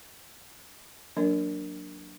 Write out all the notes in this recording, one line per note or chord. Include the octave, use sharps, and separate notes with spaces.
E3 F#3 A#3 D4 A#4